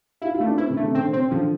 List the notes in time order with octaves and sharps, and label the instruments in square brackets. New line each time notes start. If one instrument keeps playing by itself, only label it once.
[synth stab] E4 [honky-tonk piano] F4
[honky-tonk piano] F4
[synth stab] A3
[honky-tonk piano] D4
[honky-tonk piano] C4 [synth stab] E4
[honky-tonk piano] D3
[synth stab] A3
[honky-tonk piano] C3
[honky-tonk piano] D3 [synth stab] C4
[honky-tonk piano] C3 [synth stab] C4
[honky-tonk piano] D3 [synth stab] F3